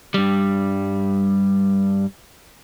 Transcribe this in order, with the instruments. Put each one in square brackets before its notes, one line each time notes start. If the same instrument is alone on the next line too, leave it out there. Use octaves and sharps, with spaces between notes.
[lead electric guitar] G2 G3